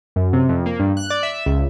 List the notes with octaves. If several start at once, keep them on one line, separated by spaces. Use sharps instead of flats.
F#2
C3
F2
A#3
G2
F#6
D5
E5
C#2